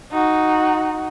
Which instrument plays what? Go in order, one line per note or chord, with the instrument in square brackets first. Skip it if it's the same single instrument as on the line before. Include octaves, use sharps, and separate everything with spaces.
[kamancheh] D#4 F#4